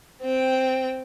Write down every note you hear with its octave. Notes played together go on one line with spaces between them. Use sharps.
C4 G5